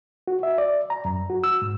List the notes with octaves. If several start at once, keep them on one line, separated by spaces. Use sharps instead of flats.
F#4
E5
D5
A#5
F#2
F#4
E6
G#2